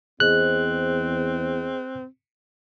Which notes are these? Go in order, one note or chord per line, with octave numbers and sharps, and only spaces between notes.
E2 C4 G#4 C5 D#5 F#6